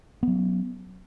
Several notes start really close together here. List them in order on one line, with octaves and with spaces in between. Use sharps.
B3 F#3 C#4